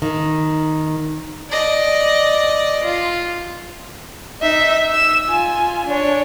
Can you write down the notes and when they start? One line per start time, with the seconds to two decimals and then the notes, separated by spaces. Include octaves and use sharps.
0.02 D#3
1.50 D5 D#5
2.83 F4
4.41 D#4 E5
4.89 E6 E7
5.27 F4 G#5
5.86 D4 C#5